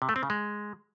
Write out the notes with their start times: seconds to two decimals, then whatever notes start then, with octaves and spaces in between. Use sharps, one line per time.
0.02 C3
0.09 A3
0.16 C4
0.23 C#3
0.30 G#3